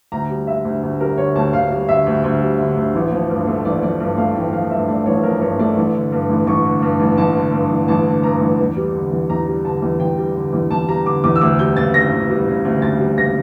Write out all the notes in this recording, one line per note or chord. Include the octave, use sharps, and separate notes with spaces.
D2 A#5
G3
D3 E5
D2
D2
G3 A#4
D3 C#5
D2 A5
D2 F5
G3
D3 E5
D2
D2
G3
D3
D2
A1
F3
G2
A3
A1 D5
F3 D5
G2
A3 F5
A1 G5
F3 F5
G2 E5
A3 D5
A1 C#5
F3 A#4
G2 C#5
A3 D5
A1
D3
G2
A1
A1 C#6
D3
G2
A1
A1 A5
D3
G2
A1
A1 A5
D3
G2 A#5
A1
E2
G3
D3
E2
E2 A#5
G3
D3 A5
E2
E2 G5
G3
D3
E2
E2 A5
G3 A#5
D3 D6
E2 D6
E6
D2 D6
G3 G6
C#3 A6
D2 A#6
D2
G3
C#3
D2
D2 A6
G3
C#3 A#6